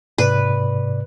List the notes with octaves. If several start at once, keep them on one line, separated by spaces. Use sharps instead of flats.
G#2 C3 B4 D5